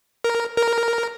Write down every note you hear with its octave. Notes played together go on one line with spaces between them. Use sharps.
A#4
A#4